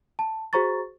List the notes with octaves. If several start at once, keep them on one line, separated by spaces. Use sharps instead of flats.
A5
F#4 G#4 C5 A#5 C#6 A6